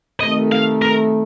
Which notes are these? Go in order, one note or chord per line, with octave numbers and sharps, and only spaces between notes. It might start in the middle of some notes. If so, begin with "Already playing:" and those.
C3 D#3 A3 D#5
F5
A#4